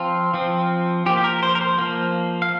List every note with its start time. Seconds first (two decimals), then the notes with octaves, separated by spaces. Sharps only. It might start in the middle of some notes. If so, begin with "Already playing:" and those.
Already playing: F3 C4 F4
0.34 F3 C4
1.06 F3 G4
1.09 A#3
1.17 G4
1.24 A#4
1.43 C5
1.55 A#4
1.61 C5
1.78 F3 A#3
2.42 F5